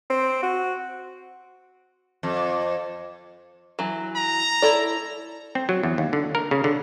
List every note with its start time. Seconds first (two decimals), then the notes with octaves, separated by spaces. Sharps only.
0.10 C4
0.43 F#4
2.23 F2
3.79 E3 F#3
4.16 A#5
4.62 E4 A4 D5
5.55 C4
5.69 F#3
5.83 E2
5.98 D#2
6.13 D3
6.35 A#4
6.51 C#3
6.64 D3